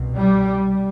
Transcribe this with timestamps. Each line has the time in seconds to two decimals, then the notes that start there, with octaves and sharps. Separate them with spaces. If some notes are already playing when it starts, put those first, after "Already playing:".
Already playing: C2 B2
0.15 G3